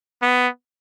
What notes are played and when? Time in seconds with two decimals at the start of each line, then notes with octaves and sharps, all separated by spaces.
0.22 B3